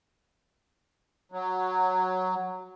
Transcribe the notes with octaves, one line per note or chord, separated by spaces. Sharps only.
F#3